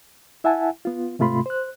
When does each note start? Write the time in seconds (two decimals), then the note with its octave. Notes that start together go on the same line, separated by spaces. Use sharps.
0.44 E4 E5 F#5 G#5 A5
0.85 B3 F4
1.19 G#2 C3 A3 F4 B5 C6
1.46 C5 F#6